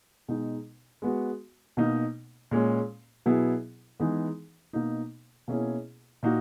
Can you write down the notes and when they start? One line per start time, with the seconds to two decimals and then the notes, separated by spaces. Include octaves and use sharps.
0.28 B2 G#3 D#4
1.02 G#3 B3 F#4
1.77 B2 A#3 D#4
2.51 A#2 G#3 C#4
3.26 B2 F#3 B3 E4 G#4
4.00 E3 G#3 B3 D#4 G#4
4.73 B2 A#3 D#4
5.48 B2 A#3 C#4 E4 G#4
6.23 A#2 A#3 D#4 F#4